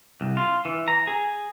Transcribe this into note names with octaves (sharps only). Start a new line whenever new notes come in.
C2
F4
E3
A#5
G#4